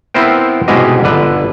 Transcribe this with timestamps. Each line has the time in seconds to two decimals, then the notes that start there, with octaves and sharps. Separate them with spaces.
0.14 B3 C4 E4 A#4 C5 G5
0.68 C2 G#2 B2 G#3 G4 D#5
1.03 G1 D3 B4